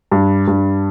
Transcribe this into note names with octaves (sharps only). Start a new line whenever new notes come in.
G2
G2